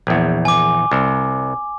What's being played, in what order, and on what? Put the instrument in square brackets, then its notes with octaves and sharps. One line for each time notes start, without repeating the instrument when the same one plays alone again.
[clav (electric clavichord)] A#1 E2
[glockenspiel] G#5 D6
[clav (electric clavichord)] C2